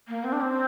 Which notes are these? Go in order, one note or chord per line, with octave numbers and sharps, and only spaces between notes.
A#3
C4
D4
C4